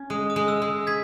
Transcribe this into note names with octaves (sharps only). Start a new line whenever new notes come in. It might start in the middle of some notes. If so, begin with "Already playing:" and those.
Already playing: C#4
G#3 D#6
D#6
G#3
E6
G#3
G#4 G#6 B6